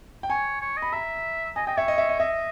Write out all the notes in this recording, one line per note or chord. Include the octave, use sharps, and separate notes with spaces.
G5
C#5 G#5
C#5
D#5
B5
E5 A#5
D#5 G#5
D#5 G5
C#5 E5
D#5
E5
D#5
D#5 E5